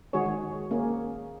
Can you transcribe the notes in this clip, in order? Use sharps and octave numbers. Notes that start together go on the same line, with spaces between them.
D#3 G#3 F#4 G#4 C#5
D#3
A#3 C#4 G#4